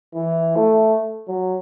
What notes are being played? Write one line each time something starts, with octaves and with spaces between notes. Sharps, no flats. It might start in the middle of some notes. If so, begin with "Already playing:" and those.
E3
A3
F#3